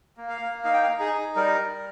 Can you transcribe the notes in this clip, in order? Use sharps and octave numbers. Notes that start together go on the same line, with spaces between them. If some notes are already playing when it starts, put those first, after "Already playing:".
A#3
F5
A#3
D#4 F5
G5
F5
D#4
G#4
D#4
G3 A#4
G3